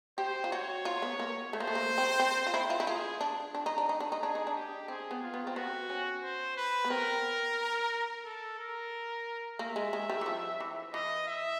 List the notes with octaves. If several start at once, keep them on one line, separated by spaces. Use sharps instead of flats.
G4 C5
F4
F#4 C#5
F4
B3
A#3
A3 C5
A#3
A3
A#3
C4
C4
F4
E4
F4
E4
F4 G#4
D4
D4
D#4
D4
D#4
D4
D#4
D4 G#4
D#4
D4
G4
C4 G#4
B3
F4
B3
C4
B3 F#4
C#4
C5
B4
B3
C4 A#4
A4
A#4
A#3 E5
G#3
G#3
G3
E3
F3
E3
E3 D#5
E5